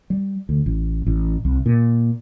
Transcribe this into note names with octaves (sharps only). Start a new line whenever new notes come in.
G3
D2
A1
A1
C2
A#2